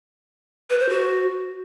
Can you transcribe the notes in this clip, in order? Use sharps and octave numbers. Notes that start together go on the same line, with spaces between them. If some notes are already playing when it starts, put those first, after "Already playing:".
B4
C5
F#4